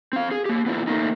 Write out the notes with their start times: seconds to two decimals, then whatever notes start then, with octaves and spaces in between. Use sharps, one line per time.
0.13 C4 F5
0.31 G#4
0.45 A#3 G4
0.66 B3 E4 F4
0.87 A3 A#3 D#4